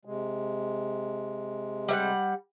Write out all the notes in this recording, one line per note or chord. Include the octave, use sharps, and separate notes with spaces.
C3 G#3
G3 E5 F#5